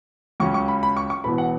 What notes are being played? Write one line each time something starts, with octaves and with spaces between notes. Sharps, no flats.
C#2 C#3 F#3 C#4 C#6
C#6
B5
B5
C#6
C#6
E1 E2 B2 B3 B5
F#5